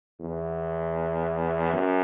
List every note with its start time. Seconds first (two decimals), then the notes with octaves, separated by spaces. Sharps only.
0.20 E2
1.74 F#2